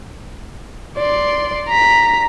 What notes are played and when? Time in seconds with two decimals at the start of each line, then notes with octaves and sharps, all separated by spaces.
0.97 D5 C6
1.69 A#5 B6